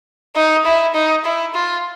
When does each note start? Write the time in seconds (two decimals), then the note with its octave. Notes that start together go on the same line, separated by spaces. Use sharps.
0.36 D#4
0.65 E4
0.94 D#4
1.24 E4
1.54 F4